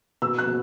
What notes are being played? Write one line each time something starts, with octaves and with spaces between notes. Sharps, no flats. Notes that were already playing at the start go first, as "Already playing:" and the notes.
B2 E6
F#6
B2